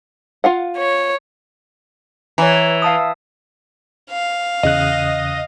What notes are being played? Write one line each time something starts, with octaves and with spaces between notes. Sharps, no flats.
F4 F5 F#5
C#5
E3 C#5 A#5
F5 A5 D#6
F5
E2 C#3 D#5 F#6